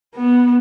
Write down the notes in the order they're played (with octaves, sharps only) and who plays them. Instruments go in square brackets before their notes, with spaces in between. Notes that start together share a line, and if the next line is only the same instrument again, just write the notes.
[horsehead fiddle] B3